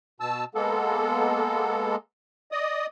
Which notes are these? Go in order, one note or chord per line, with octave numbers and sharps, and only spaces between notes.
B2 A5 E6
G#3 A#3 B3 A4
D5 D#5 D#6